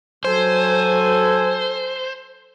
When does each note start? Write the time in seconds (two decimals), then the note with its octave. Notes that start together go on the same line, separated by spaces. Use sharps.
0.25 F#3 A4 C5 G#5